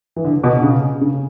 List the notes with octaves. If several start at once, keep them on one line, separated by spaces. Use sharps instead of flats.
E3
D3
B2
D3
C#3
C#3